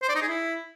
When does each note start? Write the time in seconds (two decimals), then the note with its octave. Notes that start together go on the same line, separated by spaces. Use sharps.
0.02 C5
0.09 D5
0.15 D#4
0.22 G#4
0.28 E4